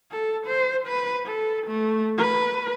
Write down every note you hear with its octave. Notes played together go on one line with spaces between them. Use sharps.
A4
C5
B4
A4
A3
B4